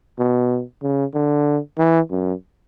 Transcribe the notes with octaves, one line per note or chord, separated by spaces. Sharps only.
B2
C#3
D3
E3
F#2